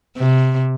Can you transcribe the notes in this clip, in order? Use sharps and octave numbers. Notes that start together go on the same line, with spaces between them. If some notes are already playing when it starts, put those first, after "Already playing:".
C3